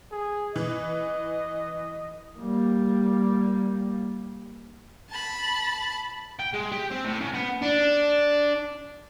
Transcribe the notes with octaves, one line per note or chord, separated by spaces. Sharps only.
G#4
E3 D#5
G3 A#3
A5 B5
G5
G#3
G4
C4
A2
C#3
B3
D4